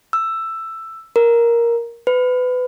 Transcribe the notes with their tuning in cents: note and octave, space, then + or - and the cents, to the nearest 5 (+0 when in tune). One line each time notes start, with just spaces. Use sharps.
E6 +10
A#4 +5
B4 +25